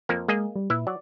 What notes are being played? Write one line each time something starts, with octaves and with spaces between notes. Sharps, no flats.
F2 F3 A#3
G#3 A#3 G#4 D#5
G3
A#2 E4 B4 E5
F#3 D5